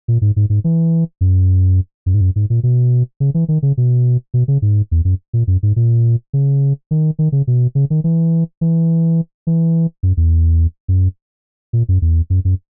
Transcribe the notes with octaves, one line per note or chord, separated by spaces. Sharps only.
A#2
G#2
G#2
G#2
E3
F#2
F#2
G#2
F#2
G#2
A#2
B2
C#3
E3
D#3
C#3
B2
B2
C#3
G#2
E2
F#2
A#2
F#2
G#2
A#2
C#3
D#3
D#3
C#3
B2
C#3
D#3
E3
E3
E3
F#2
E2
F#2
A#2
F#2
E2
F#2
F#2